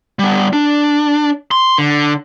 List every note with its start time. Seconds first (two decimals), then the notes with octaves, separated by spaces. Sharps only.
0.19 G3 B3
0.53 D4
1.51 C6
1.78 D3